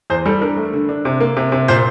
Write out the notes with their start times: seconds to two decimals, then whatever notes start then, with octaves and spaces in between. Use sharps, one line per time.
0.10 E2 C5
0.26 G3 A4
0.41 D4 A#4
0.57 A3
0.74 D3
0.89 D4
1.05 C3
1.20 A#3
1.37 C3
1.52 C3
1.68 A#2 C5